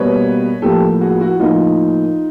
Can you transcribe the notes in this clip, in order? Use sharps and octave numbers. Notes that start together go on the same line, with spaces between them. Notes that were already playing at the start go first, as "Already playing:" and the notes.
Already playing: B2 G3 A#3 B4 C#5
A2 F3 A#3 G4 A4
F#4 G#4
E4 F#4
A2 F3 A#3 D#4 F4